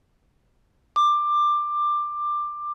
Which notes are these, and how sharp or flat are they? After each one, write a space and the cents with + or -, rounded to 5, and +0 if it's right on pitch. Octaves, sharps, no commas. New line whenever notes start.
D6 +15